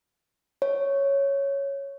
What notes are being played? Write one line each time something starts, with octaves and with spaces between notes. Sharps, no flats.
C#5